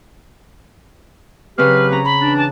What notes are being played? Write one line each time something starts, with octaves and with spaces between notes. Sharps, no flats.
C#3 F#3 C4 G4 B4 F6
C#4 A#5
B5
E3 D4
A5